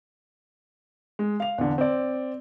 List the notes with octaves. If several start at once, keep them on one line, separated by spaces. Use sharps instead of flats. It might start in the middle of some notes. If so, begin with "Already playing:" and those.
G#3
F5 F7
E2 D3
C4 D5